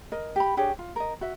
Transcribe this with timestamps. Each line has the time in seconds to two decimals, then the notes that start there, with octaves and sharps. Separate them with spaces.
0.12 A#4 D#5
0.36 G4 B5
0.57 D4 G4 G#4 C#5
0.79 F4
0.96 A#4 D#5
1.21 F#4 E5